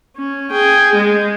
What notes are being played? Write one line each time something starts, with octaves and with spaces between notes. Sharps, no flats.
C#4
G#4 G5
G#3